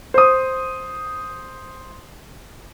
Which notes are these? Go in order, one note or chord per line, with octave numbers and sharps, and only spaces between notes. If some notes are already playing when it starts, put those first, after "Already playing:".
C5 D#6